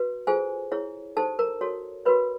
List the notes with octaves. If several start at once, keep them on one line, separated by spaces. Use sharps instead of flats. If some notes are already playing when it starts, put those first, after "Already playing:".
Already playing: F#4 B4
F4 G#4 A4 C5 G#5
E4 G#4 C#5
D#4 G4 A4 C5 A5
A#4 A#5
F#4 A4 C#5
F#4 A#4 B4 C#5 B5